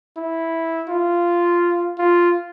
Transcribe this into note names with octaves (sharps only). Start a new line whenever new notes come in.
E4
F4
F4